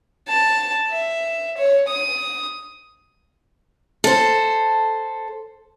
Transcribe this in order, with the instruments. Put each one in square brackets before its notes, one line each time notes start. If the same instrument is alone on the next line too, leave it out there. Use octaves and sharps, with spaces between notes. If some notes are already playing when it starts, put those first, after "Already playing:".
[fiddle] A5
E5
C#5
D#6
[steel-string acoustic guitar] A4 C5